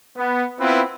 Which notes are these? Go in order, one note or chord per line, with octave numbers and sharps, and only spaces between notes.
B3
B3 C4 E4 F4 B4